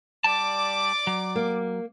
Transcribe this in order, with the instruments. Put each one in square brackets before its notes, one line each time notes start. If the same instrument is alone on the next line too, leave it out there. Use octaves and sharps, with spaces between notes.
[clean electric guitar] G3 A5 [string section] D5 D6
[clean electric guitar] F#3
[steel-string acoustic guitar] A#3